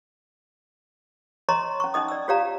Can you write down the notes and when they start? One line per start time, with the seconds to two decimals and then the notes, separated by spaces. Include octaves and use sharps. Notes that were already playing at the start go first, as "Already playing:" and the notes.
1.49 C#5 D#5 A#5 C6 C#6
1.80 C#4 C#6
1.94 C#4 D#4 D#5 D#6
2.08 D5 E6
2.28 F4 G4 C#5 D5 F5 A#5